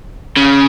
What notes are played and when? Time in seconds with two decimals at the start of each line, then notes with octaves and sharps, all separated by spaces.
0.36 C#3